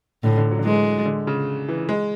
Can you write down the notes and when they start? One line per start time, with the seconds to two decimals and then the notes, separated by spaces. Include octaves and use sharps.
0.23 A2 D3
0.38 D3
0.51 F#3
0.59 D3
0.65 E3 G#3
1.05 D3
1.27 C#3
1.68 E3
1.89 G#3